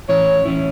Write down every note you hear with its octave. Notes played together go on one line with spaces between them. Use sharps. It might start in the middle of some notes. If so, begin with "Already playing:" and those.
A2 E3 C#4 E4 C#5
A2 E3 C#4 E4